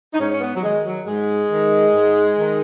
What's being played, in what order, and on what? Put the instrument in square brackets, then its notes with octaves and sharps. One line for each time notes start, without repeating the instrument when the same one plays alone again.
[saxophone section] D#4
G#2 C#4
C#4
B3
F#3
D#3 G#3
F#3
G#2 G#3
D#3
G#2
D#3